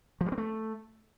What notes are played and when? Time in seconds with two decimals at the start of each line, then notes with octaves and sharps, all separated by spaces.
0.21 F3
0.26 G3
0.32 C4
0.38 A3